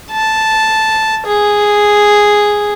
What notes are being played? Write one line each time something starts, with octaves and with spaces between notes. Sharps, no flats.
A5
G#4